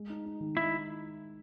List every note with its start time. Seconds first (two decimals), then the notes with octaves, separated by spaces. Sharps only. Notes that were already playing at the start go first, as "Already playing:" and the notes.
Already playing: G#3
0.10 D#4
0.26 D#4
0.40 D#3
0.57 D#4 E4